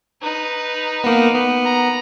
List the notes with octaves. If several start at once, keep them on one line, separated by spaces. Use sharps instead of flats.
D#4 B4
A#3 B3
B3
A#5